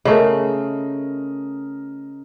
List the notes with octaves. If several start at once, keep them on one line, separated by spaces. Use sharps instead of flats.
C#3 A3 A#4 D#5